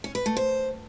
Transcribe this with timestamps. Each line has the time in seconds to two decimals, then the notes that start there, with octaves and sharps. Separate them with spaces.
0.04 C#4
0.15 B4
0.26 A3
0.37 C5